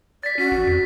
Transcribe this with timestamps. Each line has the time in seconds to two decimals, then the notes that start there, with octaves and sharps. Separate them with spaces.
0.23 D5 A6 B6
0.38 C#4 F#4
0.52 A1
0.67 F2